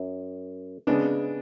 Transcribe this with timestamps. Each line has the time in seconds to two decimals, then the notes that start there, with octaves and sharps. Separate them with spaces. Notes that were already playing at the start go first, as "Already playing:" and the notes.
Already playing: F#2
0.87 C#3 G#3 B3 D4